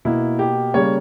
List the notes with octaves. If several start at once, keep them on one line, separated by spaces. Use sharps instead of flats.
B2 A#3 E4
G4
C#3 G3 A#3 C#5